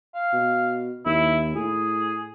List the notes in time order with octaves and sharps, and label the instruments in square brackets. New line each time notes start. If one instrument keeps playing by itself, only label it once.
[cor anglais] F5
[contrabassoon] B2
[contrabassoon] D#2 [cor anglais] E4
[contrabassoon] A2 [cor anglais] G#4